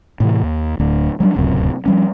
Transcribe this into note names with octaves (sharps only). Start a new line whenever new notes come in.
A2 C3 E3
D#2
D1 D2 D4
F#3 G3 A#3 D4
D1 C#2 F#2 C3
F3 G3 C#4